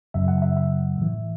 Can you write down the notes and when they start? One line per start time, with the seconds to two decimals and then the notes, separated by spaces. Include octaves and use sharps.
0.14 F#2 C#3 F#3 E5
0.28 F#5
0.38 F#5
0.42 E5
0.57 E5
0.98 A2 E3